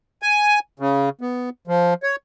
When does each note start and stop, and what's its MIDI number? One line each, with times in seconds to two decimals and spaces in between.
0.22 0.59 80
0.80 1.09 49
1.21 1.50 59
1.68 1.94 53
2.03 2.16 73